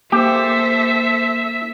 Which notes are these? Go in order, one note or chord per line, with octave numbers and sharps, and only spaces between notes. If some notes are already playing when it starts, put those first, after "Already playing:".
A#3 G4 A4 C5 E5